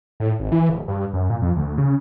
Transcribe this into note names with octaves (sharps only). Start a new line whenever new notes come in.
A2
G#1
E3
D1
G2
F#2
A#2
F2
D2
C#3